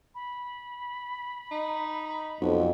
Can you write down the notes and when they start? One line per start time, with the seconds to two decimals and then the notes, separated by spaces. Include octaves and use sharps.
0.15 B5
1.51 D#4
2.41 B1 F2 F#5